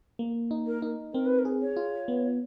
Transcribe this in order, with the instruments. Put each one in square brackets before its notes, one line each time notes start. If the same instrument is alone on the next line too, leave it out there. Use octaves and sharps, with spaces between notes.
[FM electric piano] A#3
D#4
[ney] A#4
[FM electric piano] D#4
[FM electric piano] C4 [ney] A#4
[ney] B4
A#4
[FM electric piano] G#4
[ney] C#5
[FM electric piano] F4
B3